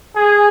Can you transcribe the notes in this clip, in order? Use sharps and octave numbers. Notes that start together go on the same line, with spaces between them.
G#4